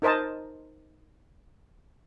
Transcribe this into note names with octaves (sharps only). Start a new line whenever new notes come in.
D#4 A#4 C5 D#5 A5